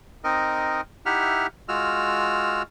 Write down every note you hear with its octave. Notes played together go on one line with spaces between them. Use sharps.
C4 D#4 A#4 D#5
D#4 E4 G4 E5 F#5 F6
G#3 F4 F#4 E6 F6